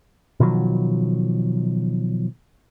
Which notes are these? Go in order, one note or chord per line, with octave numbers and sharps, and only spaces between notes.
B2 D#3 F3 F#3